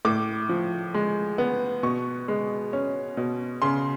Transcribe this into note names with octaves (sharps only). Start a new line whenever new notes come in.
A2 D6
F3
G#3
B3
B2 C#6
G#3
C#4
B2
C#3 C6